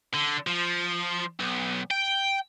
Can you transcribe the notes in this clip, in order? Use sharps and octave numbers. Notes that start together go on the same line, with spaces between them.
D3
F3
B1
G5